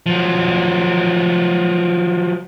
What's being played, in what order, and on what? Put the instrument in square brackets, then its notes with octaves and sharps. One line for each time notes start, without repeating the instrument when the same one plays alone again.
[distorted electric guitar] F3 F#3